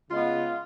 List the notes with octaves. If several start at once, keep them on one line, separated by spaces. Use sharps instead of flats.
C#3 G#3 B3 F4